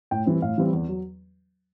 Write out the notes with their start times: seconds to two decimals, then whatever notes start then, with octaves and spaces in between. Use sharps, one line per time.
0.11 A2 G5
0.26 E3 G3 C4
0.42 A2 F5
0.58 E3 G3 C4
0.73 E2
0.89 F#3